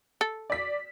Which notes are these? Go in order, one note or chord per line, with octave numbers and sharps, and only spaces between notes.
A4
D5 B6